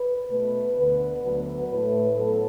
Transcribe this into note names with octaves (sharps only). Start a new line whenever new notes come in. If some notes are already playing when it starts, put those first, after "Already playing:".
Already playing: B4
B2 A3 B4
D2 D3 B3 B4
D2 D3 F#3 B3 B4
A2 A3 B4
A2 F#3 B3 A4